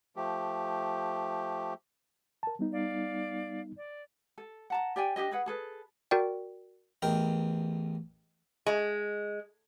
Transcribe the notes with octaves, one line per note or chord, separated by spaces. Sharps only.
F3 A3 G4
A#4 A5
G3 B3 D#4
D5 F5
D5
A4
F#5 A5 A#5
G4 D5 G5 G#5
D4 G4 G#4 D#5
G#4 B4 F#5
G#4 A4 B4
F#4 A#4 D5 G5
A1 E2 A#4 D#5 G5
G#3